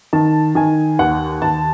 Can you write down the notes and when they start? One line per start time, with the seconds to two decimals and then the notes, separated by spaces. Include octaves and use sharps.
0.13 D#3 A5
0.55 D#3 G#5
0.99 D#2 F#5
1.42 D#2 A5